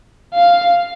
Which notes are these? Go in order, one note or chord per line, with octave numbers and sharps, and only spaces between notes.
F5